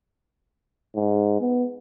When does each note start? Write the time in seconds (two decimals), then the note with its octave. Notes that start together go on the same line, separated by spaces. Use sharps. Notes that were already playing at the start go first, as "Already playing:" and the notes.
0.96 G#2
1.41 B3